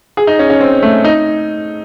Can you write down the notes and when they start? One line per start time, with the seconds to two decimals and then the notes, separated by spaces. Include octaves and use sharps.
0.17 G#4
0.27 D#4
0.39 C#4
0.50 C#4
0.60 C4
0.82 A3
1.04 D#4